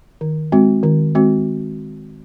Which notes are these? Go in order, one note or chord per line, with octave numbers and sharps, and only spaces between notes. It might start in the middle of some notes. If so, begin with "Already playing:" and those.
D#3
G#3 C4 F#4
D#3
G#3 C4 F#4